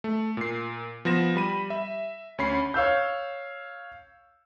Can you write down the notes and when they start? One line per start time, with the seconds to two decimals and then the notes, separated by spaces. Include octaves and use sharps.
0.04 A3
0.37 A#2 C7
1.05 F3 B3 A#6 E7
1.36 G3 B5 D#7
1.70 E5
2.38 D2 C#4 B5 C7
2.74 C#5 F5 E6 G6